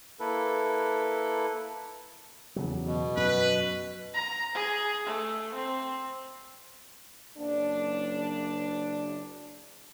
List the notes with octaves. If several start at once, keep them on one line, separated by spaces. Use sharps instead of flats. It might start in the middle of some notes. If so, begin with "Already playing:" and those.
A#3 E4 A4 B4
E2 C#3 F#3
B2
F#2 B4
A#5
G#4
A3
C4
F#1 D4